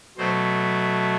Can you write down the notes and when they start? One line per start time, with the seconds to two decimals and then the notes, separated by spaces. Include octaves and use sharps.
0.17 B2 F#3 A3 C5